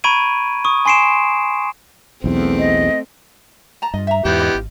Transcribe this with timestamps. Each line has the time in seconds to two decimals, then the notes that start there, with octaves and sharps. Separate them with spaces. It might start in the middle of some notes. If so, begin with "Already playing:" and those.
0.04 A#5 B5 C#6 G#6 D7 D#7
0.65 C#6 D#6
0.85 G#5 C6 C7 D7 E7
2.24 B1 E2 A3 C4
2.59 D#5
3.82 A5 A#5
3.94 G2 F4 D#5
4.07 E5 A#5
4.25 E2 G#2 E3 B3 F4 G4 C5
4.39 D4 F4 D#5
4.54 G#1